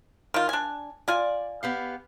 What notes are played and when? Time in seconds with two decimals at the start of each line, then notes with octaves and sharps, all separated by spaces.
0.34 D#3 F4
0.49 D4 G#5
1.08 F4 D5 G#5
1.63 B3 G4 F5